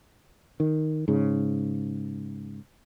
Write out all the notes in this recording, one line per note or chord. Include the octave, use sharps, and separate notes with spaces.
D#3
G#2 C#3